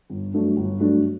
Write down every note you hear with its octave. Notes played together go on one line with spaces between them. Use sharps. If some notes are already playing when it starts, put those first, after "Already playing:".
G1
G2 F#3 A3 D4
G1
G2 F#3 A3 D4